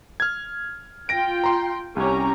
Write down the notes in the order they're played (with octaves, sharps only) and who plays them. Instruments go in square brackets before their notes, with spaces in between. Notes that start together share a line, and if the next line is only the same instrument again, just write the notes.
[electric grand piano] F6 G#6
[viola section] F4 G5 [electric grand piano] A#6 D7
[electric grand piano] A#5 C6
[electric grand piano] C2 [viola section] C#4 G4 A#5